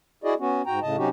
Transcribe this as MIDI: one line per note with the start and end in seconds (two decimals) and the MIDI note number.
0.24 0.34 64
0.24 0.34 66
0.24 0.34 68
0.24 0.34 74
0.24 0.34 75
0.39 0.62 59
0.39 0.62 61
0.39 0.62 66
0.66 0.79 44
0.66 0.79 66
0.66 0.79 79
0.66 0.79 82
0.82 0.96 45
0.82 0.96 49
0.82 0.96 75
0.82 0.96 81
0.97 1.09 48
0.97 1.09 54
0.97 1.09 61
0.97 1.09 63
0.97 1.09 66
0.97 1.09 67